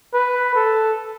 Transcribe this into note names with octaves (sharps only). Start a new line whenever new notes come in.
B4
A4